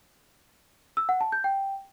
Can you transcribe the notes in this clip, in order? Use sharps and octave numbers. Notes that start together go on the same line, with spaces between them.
E6
F#5
A5
G6
G5